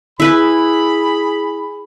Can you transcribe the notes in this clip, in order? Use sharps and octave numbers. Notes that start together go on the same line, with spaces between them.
E4 G#4 B4 B5